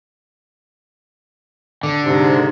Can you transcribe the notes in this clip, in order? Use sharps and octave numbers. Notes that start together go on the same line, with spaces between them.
D3
G#2 C3